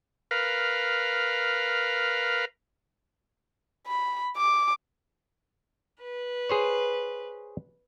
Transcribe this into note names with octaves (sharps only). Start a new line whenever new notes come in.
A#4 B4 F5
B5
D6
B4
G#4 C5 C#5